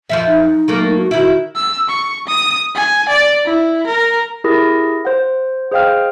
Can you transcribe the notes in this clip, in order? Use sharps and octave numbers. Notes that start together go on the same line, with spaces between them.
F2 F3 E5
D#4
F#3 A3 A#3
F#4
D#3 E4 F#4
E6
C#6
D#6
G#5
D5
E4
A#4
E4 G4 G#4 A#4 A#6
C5 F#5
G#4 C5 D#5 F5 G5 F6